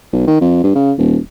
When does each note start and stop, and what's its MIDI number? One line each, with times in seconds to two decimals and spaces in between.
0.13 0.23 35
0.27 0.39 51
0.41 0.59 41
0.64 0.75 43
0.75 0.92 49
0.98 1.17 27